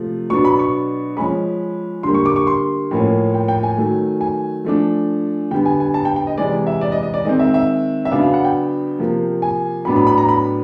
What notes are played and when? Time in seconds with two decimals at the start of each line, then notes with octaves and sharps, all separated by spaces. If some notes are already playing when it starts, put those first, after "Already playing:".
Already playing: C3 F3 A3
0.30 B2 F#3 B3 D4 C#6
0.45 B5
0.59 C#6
1.17 F3 G#3 C#4 B5
2.03 D3 G3 A#3 C6
2.14 C#6
2.26 D6
2.36 C#6
2.47 C6
2.91 A2 F3 A#3 C#4
3.34 G5
3.48 G5
3.63 G#5
3.77 D#3 F#3 A3
4.21 G#5
4.65 F3 A3 D4
5.51 D3 G3 B3 G5
5.66 G#5
5.80 G#5
5.94 A5
6.05 G5
6.16 G5
6.27 D#5
6.38 C3 E3 G#3 D5
6.67 E5
6.81 D5
6.92 D#5
7.03 D#5
7.14 D5
7.25 D#3 G#3 C4 D#5
7.39 E5
7.54 E5
8.05 E5
8.11 C#3 F#3 B3 D4 F5
8.23 F5
8.34 F#5
8.44 G5
8.98 C3 F3 A#3
9.42 G#5
9.85 A2 F#3 B3 D4 B5
9.96 B5
10.07 B5
10.18 A#5
10.29 B5